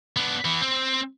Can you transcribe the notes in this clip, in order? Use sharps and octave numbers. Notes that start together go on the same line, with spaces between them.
B3 D4
E3 B3
C4